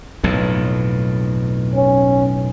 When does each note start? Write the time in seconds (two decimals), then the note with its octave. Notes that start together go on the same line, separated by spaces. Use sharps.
0.24 B1 F2 A2
1.74 C#4